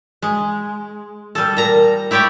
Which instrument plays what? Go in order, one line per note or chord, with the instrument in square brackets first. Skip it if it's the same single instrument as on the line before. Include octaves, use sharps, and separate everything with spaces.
[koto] G#3
G3 A4
A#2 A#5
E4 G4 C#5 D5 G5